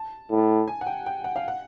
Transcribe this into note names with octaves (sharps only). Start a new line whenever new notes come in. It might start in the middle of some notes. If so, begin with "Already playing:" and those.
Already playing: A5
A2
G#5
F#5
G5
G5
F#5
F5
F#5